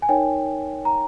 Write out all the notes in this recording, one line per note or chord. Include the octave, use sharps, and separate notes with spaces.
G#5
D#4 A#4 C#5 G5
A#5